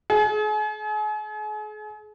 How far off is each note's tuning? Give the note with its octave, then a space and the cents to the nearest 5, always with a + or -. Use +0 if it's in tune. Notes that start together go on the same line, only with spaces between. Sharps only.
G#4 +40